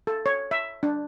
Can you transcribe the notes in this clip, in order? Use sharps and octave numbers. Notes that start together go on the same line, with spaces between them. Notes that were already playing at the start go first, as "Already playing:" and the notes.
A4
C#5
E5
D4